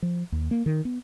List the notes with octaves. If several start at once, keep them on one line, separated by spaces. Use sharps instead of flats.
F3
D#2
A#3
D#3
B3